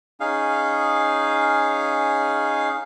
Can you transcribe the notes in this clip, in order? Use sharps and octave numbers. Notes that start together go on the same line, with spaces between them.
C#4 D#4 G#4 F5